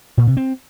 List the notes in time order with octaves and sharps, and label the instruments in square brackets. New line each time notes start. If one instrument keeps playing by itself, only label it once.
[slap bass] A#2
C3
C4